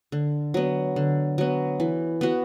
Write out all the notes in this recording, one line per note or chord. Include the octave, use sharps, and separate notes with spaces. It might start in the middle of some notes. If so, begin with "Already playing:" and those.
D3
F#3 B3
D3
F#3 B3
E3
B3 F#4